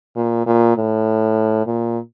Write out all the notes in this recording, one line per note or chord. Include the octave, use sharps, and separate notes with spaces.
A#2
A#2
A2
A#2